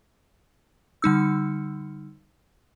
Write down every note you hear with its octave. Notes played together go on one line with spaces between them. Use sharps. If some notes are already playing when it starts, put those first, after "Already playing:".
D3 G3 D#4 E6